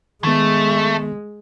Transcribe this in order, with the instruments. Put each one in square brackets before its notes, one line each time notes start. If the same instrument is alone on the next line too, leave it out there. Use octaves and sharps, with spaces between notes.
[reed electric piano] D#3 B3 [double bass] G#3 [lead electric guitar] A3